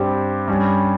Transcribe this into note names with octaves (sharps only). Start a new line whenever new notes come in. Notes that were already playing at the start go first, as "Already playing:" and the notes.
Already playing: G2 G3 C4 G4
G2 G3 C#4